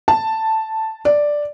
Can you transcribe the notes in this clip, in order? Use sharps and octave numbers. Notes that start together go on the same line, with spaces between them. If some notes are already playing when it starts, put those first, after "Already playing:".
A5
D5